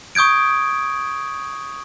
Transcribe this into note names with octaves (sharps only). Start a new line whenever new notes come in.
C#6 D#6 G6 G#6 D7